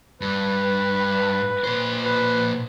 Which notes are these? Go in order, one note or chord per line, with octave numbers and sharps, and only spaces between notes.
G2 B4
A#2 C5
B4